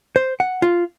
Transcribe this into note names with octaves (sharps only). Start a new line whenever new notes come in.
C5
F#5
F4